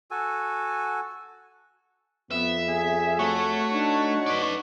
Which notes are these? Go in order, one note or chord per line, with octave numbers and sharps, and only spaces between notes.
F#4 A4 G#5
F2 B3 E5
G#4
A3 F#4 C#5
D4 D#4
B4 D5